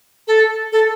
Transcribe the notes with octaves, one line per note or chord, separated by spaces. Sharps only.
A4
A4